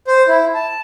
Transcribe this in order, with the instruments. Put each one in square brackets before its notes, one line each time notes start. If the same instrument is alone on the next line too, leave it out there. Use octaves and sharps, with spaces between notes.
[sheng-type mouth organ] C5
E4
A5